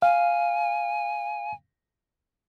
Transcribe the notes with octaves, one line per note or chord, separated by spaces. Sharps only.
F5 G#5